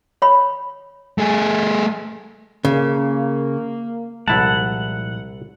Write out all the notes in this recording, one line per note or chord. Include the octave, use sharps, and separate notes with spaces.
C#5 B5
A3 G#4
C#3 A#3
C2 A#2 F3 G#3 E4 F#5 A5